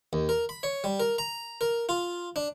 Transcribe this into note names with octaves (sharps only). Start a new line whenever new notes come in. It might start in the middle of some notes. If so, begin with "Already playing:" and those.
D#2
A#4
B5
C#5
G3
A#4
A#5
A#4
F4
D4